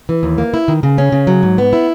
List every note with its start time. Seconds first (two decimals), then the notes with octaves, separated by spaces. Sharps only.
0.09 E3
0.23 D#2
0.38 A#3
0.54 E4
0.68 D#3
0.83 C#3
0.98 C#4
1.12 C#3
1.27 F#3
1.43 G#2
1.58 B3
1.73 E4